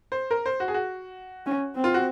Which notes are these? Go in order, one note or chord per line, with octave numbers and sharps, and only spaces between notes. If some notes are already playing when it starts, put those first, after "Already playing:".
C5
A#4
C5
F#4
G#4
F#4
C#4
C4
F4
F#4